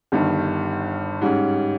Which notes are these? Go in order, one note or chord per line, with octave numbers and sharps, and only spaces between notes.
G1 G2 D#3
G#2 G3 C#4